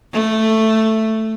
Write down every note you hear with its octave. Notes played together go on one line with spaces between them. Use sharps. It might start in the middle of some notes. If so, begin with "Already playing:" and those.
A3